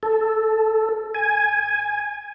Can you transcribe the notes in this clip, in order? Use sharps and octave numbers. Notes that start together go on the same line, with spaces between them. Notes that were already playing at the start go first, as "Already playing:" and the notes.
A4
G#5